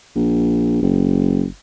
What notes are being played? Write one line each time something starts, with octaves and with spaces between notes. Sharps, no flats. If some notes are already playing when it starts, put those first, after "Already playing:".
A#1
F#1